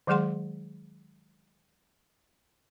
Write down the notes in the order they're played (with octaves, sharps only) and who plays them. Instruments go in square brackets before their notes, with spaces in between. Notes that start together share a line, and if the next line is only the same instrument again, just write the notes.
[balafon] D#3 F#3 G#3 G#4 F#5 C6